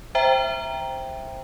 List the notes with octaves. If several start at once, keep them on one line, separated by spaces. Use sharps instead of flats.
C5 E5 G5 A#5